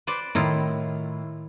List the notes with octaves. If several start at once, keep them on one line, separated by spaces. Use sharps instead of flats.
B4 C5 D5
A2 D#3 E4 F4